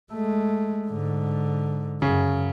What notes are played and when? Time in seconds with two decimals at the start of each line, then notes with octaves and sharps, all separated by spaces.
0.12 G#3 A3
0.87 G#2 D3
2.02 F#2 C#3